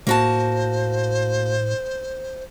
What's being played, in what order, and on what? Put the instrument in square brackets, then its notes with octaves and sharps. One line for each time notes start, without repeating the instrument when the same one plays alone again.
[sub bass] A2 [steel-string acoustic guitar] A#3 F#4 A5 [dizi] C5